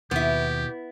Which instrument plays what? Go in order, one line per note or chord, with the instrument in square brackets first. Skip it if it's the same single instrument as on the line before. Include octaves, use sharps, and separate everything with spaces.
[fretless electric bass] D#2 [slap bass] B2 [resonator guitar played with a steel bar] B3 E4 [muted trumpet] G4